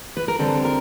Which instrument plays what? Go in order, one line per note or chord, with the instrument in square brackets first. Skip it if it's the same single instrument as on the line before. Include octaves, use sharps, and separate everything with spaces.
[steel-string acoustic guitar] B4
A#4
D3 G3 C4 A4
A#4